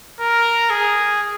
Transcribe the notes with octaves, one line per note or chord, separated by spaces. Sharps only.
A#4
G#4